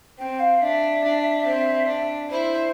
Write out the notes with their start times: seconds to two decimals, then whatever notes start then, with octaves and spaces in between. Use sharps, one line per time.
0.18 C4 G5
0.39 F5
0.61 D4 E5
1.04 D4
1.46 C4
1.88 D4
2.30 E4 C5